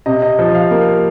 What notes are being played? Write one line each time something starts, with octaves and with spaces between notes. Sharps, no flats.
C3 D#5
D#5
F3
F5
A#3